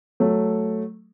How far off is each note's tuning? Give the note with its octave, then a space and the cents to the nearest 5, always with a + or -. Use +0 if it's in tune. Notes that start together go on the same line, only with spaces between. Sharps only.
F#3 +0 A3 +0